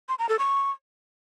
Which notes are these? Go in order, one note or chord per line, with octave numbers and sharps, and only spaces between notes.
C6
A#5
A4
C#6